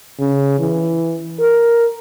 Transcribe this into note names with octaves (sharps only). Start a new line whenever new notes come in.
C#3
E3
A#4